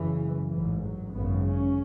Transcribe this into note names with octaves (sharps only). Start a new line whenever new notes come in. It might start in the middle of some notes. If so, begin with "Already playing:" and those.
Already playing: F#1 F#2 C#3 E3
A1 G#2 E3
F#3
G#1 F#2 C#3 B3
C#4